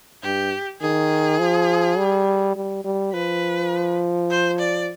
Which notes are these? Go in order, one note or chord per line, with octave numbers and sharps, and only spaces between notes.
G2 G4
D#3 G#4
F3
G3
G3
G3
F3 B4
C5
D5